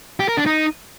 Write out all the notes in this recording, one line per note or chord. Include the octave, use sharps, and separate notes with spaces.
G4
A#4
D4
D#4